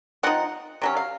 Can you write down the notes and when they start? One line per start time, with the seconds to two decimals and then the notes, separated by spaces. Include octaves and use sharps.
0.23 F3 C4 D#4 F#5
0.82 C3 F#3 C#4
0.97 F5